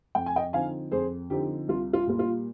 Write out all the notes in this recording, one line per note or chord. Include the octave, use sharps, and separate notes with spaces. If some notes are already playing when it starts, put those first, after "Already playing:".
F2 G5
G#5
D#5 G5
D3 F3 C4 D#4 F5 G#5
F2 G#4 C5
D3 F3 C4 D#4 G4
C2 F4
F4
A#2 G3 A#3 F4
F4